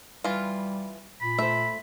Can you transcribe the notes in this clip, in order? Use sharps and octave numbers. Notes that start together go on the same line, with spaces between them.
E3 G3 F4
A#2 B5
A3 C5 E5